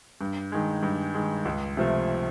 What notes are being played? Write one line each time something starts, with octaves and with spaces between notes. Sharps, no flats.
G2
D#3 G#3
G2
D#3 G#3
C#2
C3 F3 A3